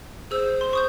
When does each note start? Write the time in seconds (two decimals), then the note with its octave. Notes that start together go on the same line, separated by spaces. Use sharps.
0.31 G#4 C5 E6
0.61 C6
0.73 C#6 D#6 G6